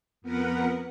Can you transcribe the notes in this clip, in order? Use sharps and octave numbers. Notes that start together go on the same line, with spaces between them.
F2 B3 A#4 B4 F#5